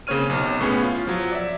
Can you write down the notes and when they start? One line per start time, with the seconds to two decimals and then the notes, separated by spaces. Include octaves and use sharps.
0.07 C#3 A#3 C4 C#5 F6 D#7
0.30 B1 C3
0.61 A2 B3 C#4 G#4
0.82 F4
1.07 F3 F#3
1.32 D5 E5